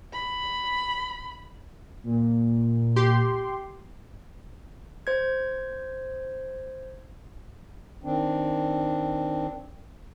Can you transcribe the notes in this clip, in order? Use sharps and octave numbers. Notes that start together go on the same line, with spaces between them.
B5
A#2
G4 C6
C5 G#6
D#3 C4 D4